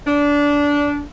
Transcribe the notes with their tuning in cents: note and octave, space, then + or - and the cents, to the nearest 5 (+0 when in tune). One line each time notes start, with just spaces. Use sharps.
D4 -20